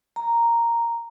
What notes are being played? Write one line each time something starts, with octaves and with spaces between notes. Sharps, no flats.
A#5